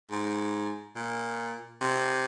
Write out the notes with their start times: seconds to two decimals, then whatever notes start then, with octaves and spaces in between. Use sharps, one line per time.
0.11 G#2
0.96 A#2
1.81 C3